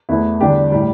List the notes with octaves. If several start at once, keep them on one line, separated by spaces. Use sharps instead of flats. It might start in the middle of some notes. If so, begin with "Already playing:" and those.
E2 E3 A3 B3 E4
E2 D3 G3 D4 G4
A2 G3